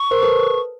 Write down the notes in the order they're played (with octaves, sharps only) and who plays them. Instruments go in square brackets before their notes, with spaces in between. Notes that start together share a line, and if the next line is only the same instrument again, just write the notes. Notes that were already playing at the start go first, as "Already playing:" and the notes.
Already playing: [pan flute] C#6
[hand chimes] A#4 C5
A4 B4